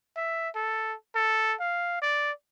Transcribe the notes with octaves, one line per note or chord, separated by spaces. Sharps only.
E5
A4
A4
F5
D5